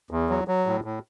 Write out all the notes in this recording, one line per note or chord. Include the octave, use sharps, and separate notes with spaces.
E2
F#3
F#3
A2
A2